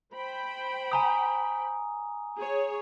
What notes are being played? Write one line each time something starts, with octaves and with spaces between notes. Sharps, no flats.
C5 G5 B5
G#5 A#5 D#6
G#4 C#5